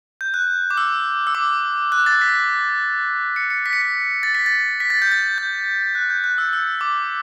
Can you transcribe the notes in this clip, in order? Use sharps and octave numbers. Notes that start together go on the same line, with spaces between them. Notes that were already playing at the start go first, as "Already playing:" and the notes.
G6
F#6
D6
E6
E6
D6
F#6
A6
B6
C#7
C#7
B6
C#7
B6
A6
B6
A6
B6
A6
G6
A6
G6
F#6
G6
F#6
E6
E6
D6